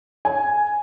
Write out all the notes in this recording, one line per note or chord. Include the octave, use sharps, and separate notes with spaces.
G#5